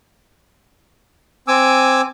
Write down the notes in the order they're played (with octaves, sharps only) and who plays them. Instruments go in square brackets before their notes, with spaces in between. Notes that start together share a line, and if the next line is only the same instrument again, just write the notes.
[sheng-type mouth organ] C4 G#5 D6 E6